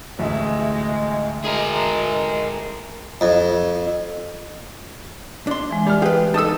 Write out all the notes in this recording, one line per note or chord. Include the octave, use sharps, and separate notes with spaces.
A1 D2 G#3 E5
G#3 G#4 A#4
F2
D4 C6
E3 G#3
G3 F6
G4 G#4 B4
D#4 A4 A5 D#6 E6